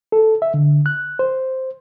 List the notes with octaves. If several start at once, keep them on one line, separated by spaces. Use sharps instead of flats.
A4
E5
D3
F#6
C5